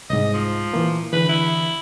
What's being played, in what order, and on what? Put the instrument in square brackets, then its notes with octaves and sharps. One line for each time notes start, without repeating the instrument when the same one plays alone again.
[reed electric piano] C2 G#2 [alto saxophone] D#5
[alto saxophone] F3
[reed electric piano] A#2 E3 A#3
[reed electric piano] D3 E3 [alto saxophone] B4
[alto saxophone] E4